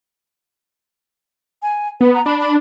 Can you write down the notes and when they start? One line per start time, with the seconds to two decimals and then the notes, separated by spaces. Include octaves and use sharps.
1.62 G#5
2.01 B3 B4
2.14 A#5
2.26 D4 B5
2.40 B5